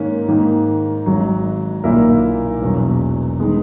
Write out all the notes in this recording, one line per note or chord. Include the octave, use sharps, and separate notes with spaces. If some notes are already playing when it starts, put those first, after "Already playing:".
Already playing: G#2 D#3 A#3 C#4
G#2 D#3 A#3
G#1 G#2 F#3
B1 A#2 A#3 E4 A#4
E1 E2 B2 F#3
D#3 G#3 B3